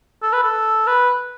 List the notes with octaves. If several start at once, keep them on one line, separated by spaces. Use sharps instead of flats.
A4
B4
A4
B4